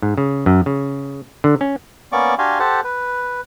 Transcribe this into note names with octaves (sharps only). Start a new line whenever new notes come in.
G#2
C#3
F#2
C#3
D3
C#4
A#3 B3 C#4 D5 C#6 D6
D4 F#4 G4 F5 G#5 C6
G4 A4 C5 F#5 A5
B4